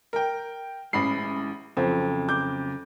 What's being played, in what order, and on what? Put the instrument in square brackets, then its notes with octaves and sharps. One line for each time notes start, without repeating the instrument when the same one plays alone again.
[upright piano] A#4 G5
[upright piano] A1 B5 C7 [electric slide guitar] G#3 C#4 E4
[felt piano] F2 [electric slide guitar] C#3 F#3 [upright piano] C4
[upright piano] D6 G6